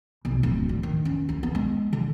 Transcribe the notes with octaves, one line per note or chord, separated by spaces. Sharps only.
B1
D1
G3
D#3
C#4
D2
B3
G#3
D3